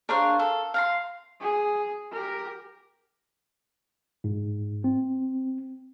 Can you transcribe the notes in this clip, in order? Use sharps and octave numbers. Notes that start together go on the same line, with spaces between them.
D4 G#4 A#4 C5 C#5 F5
A4
F5 A#5 C6
G#4
G4 A#4
G#2
C4